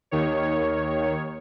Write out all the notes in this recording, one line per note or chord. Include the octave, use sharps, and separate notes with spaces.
D#2 D#3 C#5